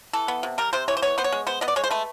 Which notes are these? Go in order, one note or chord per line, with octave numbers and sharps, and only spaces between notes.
E3 A4
B3
C3
G3 A#4
C3 C5
E3 C#5
C5
B3 C#5
B3 C5
C#5
G#3
B3 C5
B3 D#5
D5
G#3 C#5
C5
A3 B4